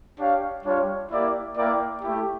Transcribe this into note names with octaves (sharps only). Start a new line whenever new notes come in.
D4 G4 C#5 F5
G3 D4 F4 C#5 F5
A#3 E4 G4 D5
A#3 E4 A#4 D5 G5
A3 E4 G4